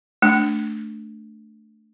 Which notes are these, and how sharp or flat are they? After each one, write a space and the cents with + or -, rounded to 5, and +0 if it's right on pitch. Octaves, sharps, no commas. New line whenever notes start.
A3 +0 D4 +0